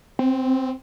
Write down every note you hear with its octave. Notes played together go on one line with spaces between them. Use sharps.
C4